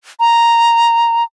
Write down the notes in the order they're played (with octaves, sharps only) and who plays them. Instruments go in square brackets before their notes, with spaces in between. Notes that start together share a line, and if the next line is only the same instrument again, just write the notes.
[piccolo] A#5